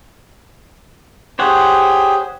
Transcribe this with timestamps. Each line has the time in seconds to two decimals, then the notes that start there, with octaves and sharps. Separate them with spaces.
1.39 G4 G#4 C5 C#5 F#5